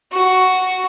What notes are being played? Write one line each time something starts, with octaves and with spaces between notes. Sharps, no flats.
F#4